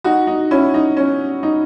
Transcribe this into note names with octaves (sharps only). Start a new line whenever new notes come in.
D#4 F#4
D#4
C#4 E4
D#4
C#4
D#4